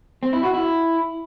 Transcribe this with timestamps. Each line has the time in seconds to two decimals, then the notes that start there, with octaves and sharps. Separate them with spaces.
0.23 C4
0.33 E4
0.43 F#4
0.54 E4